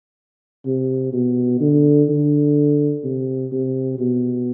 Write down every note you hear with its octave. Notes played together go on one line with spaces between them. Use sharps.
C3
B2
D3
D3
C3
C3
B2